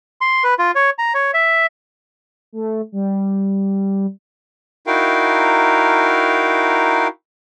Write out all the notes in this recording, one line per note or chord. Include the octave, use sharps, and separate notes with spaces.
C6
B4
F4
C#5
A#5
C#5
E5
A3
G3
D#4 E4 F#4 A#4 F5 G5